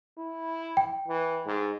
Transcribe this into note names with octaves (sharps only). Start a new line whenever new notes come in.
E4
G5
E3
G#2